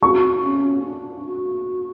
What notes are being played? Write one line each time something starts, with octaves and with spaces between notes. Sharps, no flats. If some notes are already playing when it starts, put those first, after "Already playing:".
F#4 C#6
C#4
D4
F#4